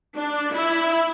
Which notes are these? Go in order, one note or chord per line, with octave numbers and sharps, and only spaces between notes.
D4
E4